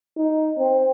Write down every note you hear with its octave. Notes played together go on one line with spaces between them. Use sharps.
D#4
C4